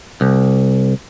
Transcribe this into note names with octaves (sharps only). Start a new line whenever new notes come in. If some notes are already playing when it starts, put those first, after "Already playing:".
C2